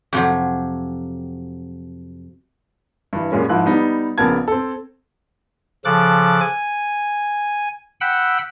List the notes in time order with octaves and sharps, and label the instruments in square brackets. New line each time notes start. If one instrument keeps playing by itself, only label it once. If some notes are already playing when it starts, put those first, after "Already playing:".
[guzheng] F2 C3 F#3
[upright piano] G2 E3
F#2 A#2 G3 G#3 C#4
G#2 F3 E4 F#6
G3 B3 D#4
A#1 C#3 B3 A#4 A5 G#6
C4 A4
[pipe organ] C#3 F3 A4 D6 F#6
G#5
F#5 G5 B5 E6 F#6